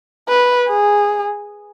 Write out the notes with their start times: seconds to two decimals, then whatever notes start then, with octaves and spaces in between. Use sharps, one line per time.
0.29 B4
0.68 G#4